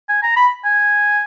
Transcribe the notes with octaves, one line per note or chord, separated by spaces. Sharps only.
G#5
A#5
B5
G#5